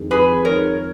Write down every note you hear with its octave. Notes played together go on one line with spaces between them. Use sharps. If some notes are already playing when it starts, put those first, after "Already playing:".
Already playing: F2 D#3 G#3
F2 G#4 B4
D#3 G#3 A#4 C#5